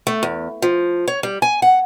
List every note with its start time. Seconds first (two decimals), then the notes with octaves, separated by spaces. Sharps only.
0.07 A3
0.23 E2
0.62 F3
1.08 C#5
1.23 G3
1.42 G#5
1.62 F#5